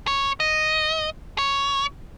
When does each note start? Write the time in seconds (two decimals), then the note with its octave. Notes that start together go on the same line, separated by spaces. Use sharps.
0.07 C#5
0.40 D#5
1.38 C#5